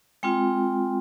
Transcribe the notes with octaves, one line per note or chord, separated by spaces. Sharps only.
G#3 C4 F4 G5